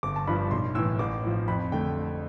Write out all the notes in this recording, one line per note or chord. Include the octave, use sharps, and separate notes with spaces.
G1 D6
A5
G2 F3 B5
B1 C6
A2 E3 E6
A1 D6
A2 F3
F2 B5
D3 A3 G5